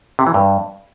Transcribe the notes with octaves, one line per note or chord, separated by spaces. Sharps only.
C3
E3
G2